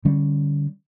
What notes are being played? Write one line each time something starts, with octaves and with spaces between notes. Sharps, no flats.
D3 G3 C#4